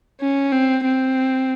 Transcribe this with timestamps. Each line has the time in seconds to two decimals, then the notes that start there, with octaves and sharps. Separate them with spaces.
0.21 C#4
0.52 C4
0.84 C4